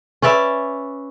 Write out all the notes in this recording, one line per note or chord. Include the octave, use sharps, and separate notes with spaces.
C#4 B4 D5 E5